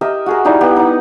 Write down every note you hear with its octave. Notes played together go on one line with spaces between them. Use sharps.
G4 A#4 D#5 E5
F#4 G#4 A#4
G3 D#4 E4 G4
B3 G4
D#4 F#5